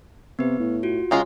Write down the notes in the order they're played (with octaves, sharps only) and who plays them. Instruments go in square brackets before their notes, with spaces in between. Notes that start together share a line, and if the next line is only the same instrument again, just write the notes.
[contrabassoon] C3 [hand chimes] B3 B4
[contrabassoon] A2
[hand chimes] F4 F#4
[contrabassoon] C#3 [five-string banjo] F#3 G#3 F4